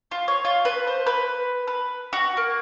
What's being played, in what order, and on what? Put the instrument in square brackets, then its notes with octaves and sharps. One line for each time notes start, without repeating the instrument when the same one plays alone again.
[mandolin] F4
C#5
F4
B4
C5
B4
B4
F#4
A#3